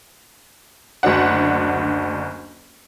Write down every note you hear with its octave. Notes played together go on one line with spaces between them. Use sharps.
F#1 D2 F#3 D4 F#5